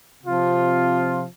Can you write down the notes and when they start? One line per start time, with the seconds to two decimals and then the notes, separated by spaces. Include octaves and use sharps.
0.23 C3 F3 C4 F4